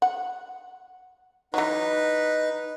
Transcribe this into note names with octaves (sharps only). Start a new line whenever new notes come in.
F#5
E3 F#3 D#4 B4